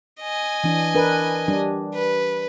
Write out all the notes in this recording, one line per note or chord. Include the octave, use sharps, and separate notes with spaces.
D#5 G#5
E3 D4
D4 A#4 B4
G3 D4
B4